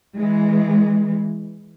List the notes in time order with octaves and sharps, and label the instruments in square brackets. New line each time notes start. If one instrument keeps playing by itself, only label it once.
[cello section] E3 G#3